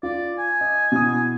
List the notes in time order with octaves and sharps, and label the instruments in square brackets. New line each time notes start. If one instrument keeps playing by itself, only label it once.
[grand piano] F4 [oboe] D5
[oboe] G#5
[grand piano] D#5
B2 E4 D#6